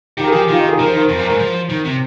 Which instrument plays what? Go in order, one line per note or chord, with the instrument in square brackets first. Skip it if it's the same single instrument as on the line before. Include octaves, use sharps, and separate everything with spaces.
[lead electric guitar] D#3 [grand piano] G4
[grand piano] A#4
[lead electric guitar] F3 [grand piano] G#4
[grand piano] G4
[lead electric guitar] D#3 [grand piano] F4
[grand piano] D#4
G#4
[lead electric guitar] F3 [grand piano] A#4
[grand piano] C5
[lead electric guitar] D#3 [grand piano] A#4
[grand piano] C5
[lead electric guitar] F2 [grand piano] A#4
[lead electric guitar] G2 [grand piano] C5
[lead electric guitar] G#2 [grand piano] A#4
[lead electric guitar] F3 [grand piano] C5
[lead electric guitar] D#3
C3